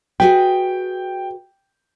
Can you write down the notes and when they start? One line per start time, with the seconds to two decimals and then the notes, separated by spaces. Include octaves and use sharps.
0.20 F#4 G#4 B4 G5